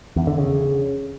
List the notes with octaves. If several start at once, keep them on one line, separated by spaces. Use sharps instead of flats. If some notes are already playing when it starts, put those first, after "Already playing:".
E2
D3
C#3